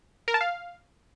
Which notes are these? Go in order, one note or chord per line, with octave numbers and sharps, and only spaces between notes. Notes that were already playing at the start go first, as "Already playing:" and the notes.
A#4
A5
F5